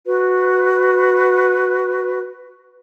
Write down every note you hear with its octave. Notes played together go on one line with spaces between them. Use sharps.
F#4 B4